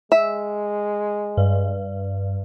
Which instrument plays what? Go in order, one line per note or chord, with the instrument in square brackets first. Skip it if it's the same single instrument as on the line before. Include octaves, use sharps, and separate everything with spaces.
[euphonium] G#3 [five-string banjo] E5
[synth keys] G2